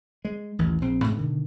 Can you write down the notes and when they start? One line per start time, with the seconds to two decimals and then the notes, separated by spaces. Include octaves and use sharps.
0.25 G#3
0.59 A1 D#2 E3
0.82 A#1 C4
1.04 G#2 C#3
1.17 B2 D3 D#3